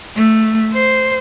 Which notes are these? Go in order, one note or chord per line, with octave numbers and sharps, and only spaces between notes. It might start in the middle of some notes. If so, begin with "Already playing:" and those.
A3
C5